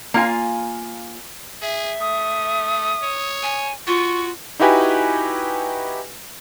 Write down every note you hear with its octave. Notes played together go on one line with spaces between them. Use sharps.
A#3 F4 G#5
G#4 E5
A3 D#6
C#5
G#5
F4 F#4 C#6
D#4 E4 F#4 G4 B4 G#5